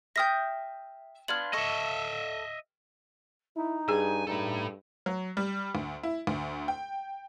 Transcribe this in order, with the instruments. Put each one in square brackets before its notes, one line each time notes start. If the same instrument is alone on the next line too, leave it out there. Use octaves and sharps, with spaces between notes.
[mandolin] E5 D#6 G6 [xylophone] G5 F6 A#6
[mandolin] B3 D4 F4 [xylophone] F6 G#6 F#7
[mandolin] A4 C#6 [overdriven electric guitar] D#5 E5
[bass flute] D#4 [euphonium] E4
[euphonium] G2 [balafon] G#4 [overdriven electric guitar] G#5
[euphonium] G2 [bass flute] D#4 [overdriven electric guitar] E4 A4
[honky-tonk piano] F#3
G3
D2
E4
D2
G5